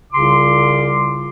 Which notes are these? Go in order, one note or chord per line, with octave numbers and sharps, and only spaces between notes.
C2 C#3 F4 C6 D6